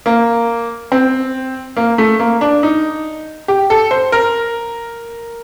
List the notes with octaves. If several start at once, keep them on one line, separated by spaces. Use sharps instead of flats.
A#3
C4
A#3
A3
A#3
D4
D#4
G4
A4
C5
A#4